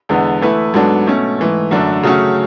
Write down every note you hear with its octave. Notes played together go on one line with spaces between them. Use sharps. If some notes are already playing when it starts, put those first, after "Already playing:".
E2 D3 G#3 B3
E3 A3 E4 B4
G#2 F#3 B3 D4 A4
B2 A3 C#4
G#2 E3 A3
F#2 D3 A3 D4
C#3 F#3 A3 C#4 F#4